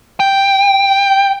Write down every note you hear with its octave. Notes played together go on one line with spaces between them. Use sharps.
G5